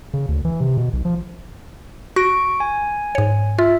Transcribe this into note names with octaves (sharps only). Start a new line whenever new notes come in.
C#3
D2
E3
C3
B2
B1
F3
F#4 C#6 A#6 D7
G#5
G#2 C#5
F4 E5